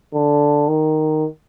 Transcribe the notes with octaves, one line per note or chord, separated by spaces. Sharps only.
D3
D#3